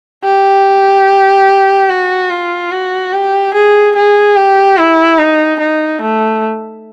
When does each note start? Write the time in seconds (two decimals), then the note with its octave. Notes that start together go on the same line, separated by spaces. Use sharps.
0.24 G4
1.89 F#4
2.30 F4
2.72 F#4
3.13 G4
3.54 G#4
3.96 G#4
4.36 G4
4.78 E4
5.19 D#4
5.60 D#4
6.02 A3